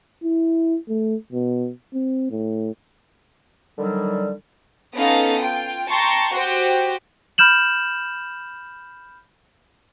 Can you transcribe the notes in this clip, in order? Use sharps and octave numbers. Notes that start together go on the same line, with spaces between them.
E4
A3
B2
C4
A2
D3 D#3 F#3 G3
B3 C#4 D#4 A4 F5 D#6
F4 G5
G5 A5 A#5 C6 C#6
F#4 G4 C5 G5
B5 F6 G6 E7 F#7